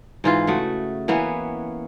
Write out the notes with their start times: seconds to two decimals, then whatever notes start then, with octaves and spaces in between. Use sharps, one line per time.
0.24 G#2 E3 F4
0.47 C#3 A3 F#4
1.08 E3 A#3 B3 C#4